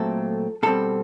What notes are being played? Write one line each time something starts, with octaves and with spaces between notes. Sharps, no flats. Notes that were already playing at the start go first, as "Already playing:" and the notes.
Already playing: A#2 F#3 A3 C4 A4
B2 G3 C4 A4